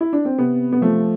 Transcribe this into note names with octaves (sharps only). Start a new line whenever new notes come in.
E4
D4
C4
C3 B3
B3
F3 A3